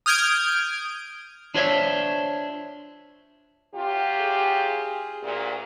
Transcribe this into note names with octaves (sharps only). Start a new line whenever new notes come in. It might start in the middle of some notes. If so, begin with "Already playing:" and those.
D#6 F6 G6 G#6 D7
D4 F4 C5 C#5 D#5 E5
F#2 F4 G4
G#4
D2 A#2